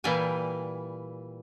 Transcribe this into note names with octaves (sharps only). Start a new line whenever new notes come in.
A#2 E3 G3 D5 G5 G#5